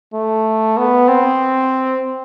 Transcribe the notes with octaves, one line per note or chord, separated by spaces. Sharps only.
A3
B3
C4